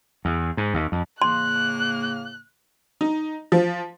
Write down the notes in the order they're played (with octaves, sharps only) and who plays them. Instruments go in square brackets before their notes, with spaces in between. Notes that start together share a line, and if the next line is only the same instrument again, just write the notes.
[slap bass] E2
G#2
D#2
F2
[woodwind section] A2 C#3 A#3 [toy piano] C6 [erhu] F#6
[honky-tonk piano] D#4
F3